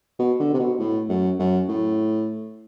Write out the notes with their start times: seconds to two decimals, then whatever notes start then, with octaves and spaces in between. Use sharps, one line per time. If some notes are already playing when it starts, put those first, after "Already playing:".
0.19 B2
0.40 D3
0.54 C3
0.59 B2
0.79 A2
1.09 F#2
1.39 F#2
1.69 A2